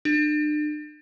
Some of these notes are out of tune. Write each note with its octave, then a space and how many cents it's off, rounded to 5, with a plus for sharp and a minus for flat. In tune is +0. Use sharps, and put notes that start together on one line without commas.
D4 +40